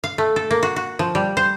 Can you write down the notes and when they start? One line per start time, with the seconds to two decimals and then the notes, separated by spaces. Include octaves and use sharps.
0.04 F5
0.18 A3
0.36 A4
0.51 A#3
0.63 F#4
0.76 F#4
0.99 F3
1.15 G3
1.37 C5